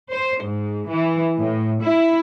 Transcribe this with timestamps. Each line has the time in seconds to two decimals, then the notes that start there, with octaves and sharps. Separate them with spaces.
0.11 C5
0.43 G#2
0.89 E3
1.40 A2
1.82 E4